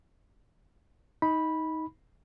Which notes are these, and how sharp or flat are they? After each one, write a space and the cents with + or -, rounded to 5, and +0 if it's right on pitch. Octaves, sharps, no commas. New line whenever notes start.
D#4 +20 B5 -10